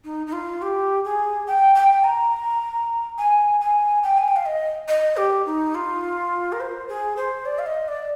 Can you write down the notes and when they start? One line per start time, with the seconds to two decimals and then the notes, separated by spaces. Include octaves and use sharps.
0.04 D#4
0.27 D#4
0.33 F4
0.62 G4
1.05 G#4
1.47 G5
1.75 G5
2.04 A#5
3.18 G#5
3.61 G#5
4.03 G5
4.18 G#5
4.28 G5
4.36 F5
4.46 D#5
4.88 D#5
5.17 G4
5.46 D#4
5.75 F4
6.52 A#4
6.60 C5
6.89 G#4
7.17 C5
7.45 D5
7.59 F5
7.66 D#5
7.88 D5